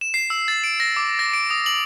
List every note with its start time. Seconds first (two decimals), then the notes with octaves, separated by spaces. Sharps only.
0.01 E7
0.14 C7
0.30 E6
0.48 A6
0.64 D7
0.80 A#6
0.96 D6
1.19 A#6
1.33 D7
1.50 D#6
1.66 F#7